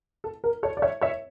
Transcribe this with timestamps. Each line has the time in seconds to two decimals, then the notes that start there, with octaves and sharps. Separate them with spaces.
0.24 A4
0.44 A#4
0.63 A4 C#5
0.77 D5
0.82 C#5 E5
1.01 C#5 E5